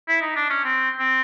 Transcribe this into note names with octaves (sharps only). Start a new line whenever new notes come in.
E4
D#4
D4
C#4
C4
C4